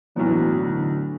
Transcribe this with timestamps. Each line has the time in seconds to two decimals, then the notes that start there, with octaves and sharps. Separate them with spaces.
0.16 B1 A2 E3 F#3 B3 D4
0.62 D3